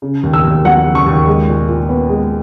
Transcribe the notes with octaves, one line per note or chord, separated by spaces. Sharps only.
C#3
D#2
E6
D#2
F#3 F#5
C#3
C#6
D#2
G#3
A#2
A#2
B3
G#3